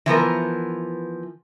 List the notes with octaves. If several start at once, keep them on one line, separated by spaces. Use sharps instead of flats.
E3 F3 B3 A#4